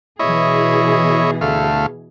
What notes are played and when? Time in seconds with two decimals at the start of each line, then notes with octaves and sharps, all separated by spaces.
0.19 B2 E3 E4 G#4 C#5 D#5
1.41 D2 A3 F5